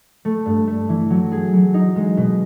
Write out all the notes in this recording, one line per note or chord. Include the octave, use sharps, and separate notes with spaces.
A3
G2
A3
E3
F#3
G#4
F#3
D#4
G#3
B2